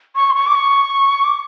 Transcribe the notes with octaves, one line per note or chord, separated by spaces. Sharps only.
C#6
C6
C#6
D6
C#6
D6